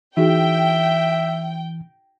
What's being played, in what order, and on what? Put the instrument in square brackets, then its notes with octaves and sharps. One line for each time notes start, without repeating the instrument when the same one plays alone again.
[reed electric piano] E3 [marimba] D#4 F#4 G#4 [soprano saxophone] E5 [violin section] G5